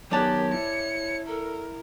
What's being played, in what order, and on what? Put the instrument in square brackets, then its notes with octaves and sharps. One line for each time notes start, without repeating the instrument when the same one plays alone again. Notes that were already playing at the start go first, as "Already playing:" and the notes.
[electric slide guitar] F#2 D#3 B3 [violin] G4 [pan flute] C#5 [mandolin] D5 A5 F#6
[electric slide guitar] E4 [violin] C#7
[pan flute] A4 [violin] A#4